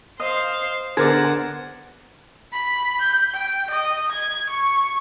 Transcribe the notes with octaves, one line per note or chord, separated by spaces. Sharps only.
C5 D#5 F5
D3 B3 G#4 A#4 C5 D5 F#5
B5
G6
G5
D#5
G#6
C#6